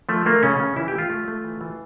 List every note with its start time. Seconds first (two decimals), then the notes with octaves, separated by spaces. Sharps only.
0.09 F3 A3
0.26 A3 A#3
0.43 C#3 C#4
0.60 C#3
0.76 E3 E4
0.88 G4
0.93 A3
0.98 F4
1.10 A3
1.28 A3
1.44 E3
1.61 E3